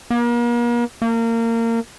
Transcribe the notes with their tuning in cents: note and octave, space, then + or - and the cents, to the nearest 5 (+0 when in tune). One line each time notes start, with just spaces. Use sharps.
A#3 +40
A#3 -25